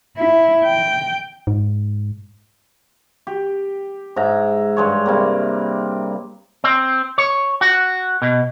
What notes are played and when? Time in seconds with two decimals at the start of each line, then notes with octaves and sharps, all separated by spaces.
0.17 E4
0.65 G5
1.47 G#2
3.27 G4
4.16 G#2 E5 A#5
4.77 G2 G#3 C#5
5.06 C3 G3 A#3
6.64 C4
7.18 C#5
7.61 F#4
8.22 B2